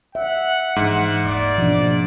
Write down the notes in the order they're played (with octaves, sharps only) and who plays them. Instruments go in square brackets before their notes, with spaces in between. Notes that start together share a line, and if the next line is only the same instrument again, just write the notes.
[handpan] E5 [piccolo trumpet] F#5
[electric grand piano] G#2 [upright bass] E3 D4
[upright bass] D#1 [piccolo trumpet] D5
[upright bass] B2 A#3 [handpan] F3 D4